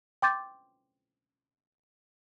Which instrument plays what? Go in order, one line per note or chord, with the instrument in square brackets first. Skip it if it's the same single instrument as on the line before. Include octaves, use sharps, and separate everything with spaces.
[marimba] G5 C6 D6 G6 A6